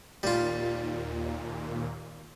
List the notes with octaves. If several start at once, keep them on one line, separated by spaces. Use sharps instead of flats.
D#2 A#2 G3 F4